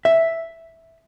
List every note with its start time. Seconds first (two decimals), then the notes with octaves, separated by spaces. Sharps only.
0.05 E5